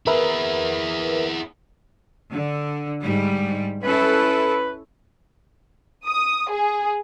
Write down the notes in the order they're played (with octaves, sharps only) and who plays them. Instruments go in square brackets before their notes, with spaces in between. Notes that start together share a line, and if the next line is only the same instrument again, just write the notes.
[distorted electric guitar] E4 G#4 [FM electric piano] A#4 B4 E5
[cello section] D3
G#2 G3
[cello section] C#4 E4 A4 [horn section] B4
[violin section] D#6
G#4